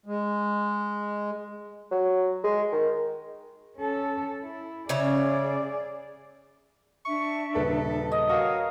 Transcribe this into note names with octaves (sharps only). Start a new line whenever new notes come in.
G#3
F#3
G#3
D#3
C#4 A4
E4
C#3 C#4 G#4 D5 E5
D4 E5 C#6
D#1 C#3 A4 B4
D#5
F#4 A#4 C#5 F5 G#5